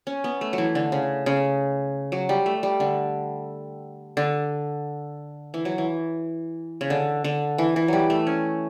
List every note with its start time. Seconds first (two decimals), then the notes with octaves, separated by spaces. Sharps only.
0.07 C#4
0.24 B3
0.41 A3
0.53 F#3
0.58 E3
0.75 D3
0.92 C#3
1.26 C#3
2.12 F#3
2.29 G3
2.46 A3
2.63 G3
2.80 D3
4.17 D3
5.54 E3
5.65 F#3
5.78 E3
6.81 C#3
6.90 D3
7.24 D3
7.58 E3
7.76 E3
7.88 F#3 G3
8.10 A3
8.27 C#4